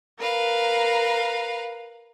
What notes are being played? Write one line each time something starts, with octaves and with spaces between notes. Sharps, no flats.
A#4 B4 F5